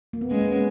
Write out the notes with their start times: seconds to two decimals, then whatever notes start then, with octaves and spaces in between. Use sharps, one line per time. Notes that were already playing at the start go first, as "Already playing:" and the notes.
0.13 A#3
0.21 B3
0.31 G#3 C#4
0.41 B3
0.51 C#4